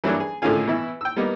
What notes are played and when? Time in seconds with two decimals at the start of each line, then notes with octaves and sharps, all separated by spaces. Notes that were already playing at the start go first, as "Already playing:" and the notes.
0.04 E3 F#3 G3 A#3 D4
0.20 G#4
0.42 A2 D3 D#3 C#4 F4 G#4
0.67 B2 E3 E4
1.01 G5 E6
1.16 G3 A#3 B3 D#4